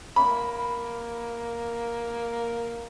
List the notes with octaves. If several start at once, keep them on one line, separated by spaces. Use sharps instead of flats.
A#3 B5